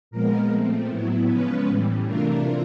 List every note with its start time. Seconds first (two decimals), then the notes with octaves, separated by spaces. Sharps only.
0.11 A#2 F3 G#3 B3 A#4
0.50 A#2 F3 A3 C4
0.89 A2 F#3 B3 E4
1.28 C#3 F3 G#3 B3 C#4 B4
1.67 A2 E3 G3
2.06 C3 E3 A3 D4 F4 A#4